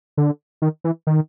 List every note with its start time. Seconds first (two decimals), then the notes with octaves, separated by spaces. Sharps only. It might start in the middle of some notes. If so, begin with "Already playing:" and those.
0.17 D3
0.62 D#3
0.84 E3
1.07 D#3